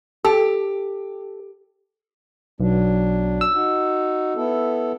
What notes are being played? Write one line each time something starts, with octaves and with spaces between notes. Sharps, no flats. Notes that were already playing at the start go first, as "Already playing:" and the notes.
G4 A4
B1 F#3 D4
E6
D#4 F#4
B3 E4 A4